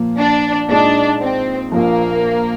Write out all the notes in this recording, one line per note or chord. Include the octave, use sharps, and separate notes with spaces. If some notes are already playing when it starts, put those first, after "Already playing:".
Already playing: A#2 F3 A#3 F4
D4
A#2 G#3 D4 D#4
C4
A#1 A#2 F3 A#3